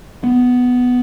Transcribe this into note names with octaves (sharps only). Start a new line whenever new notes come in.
B3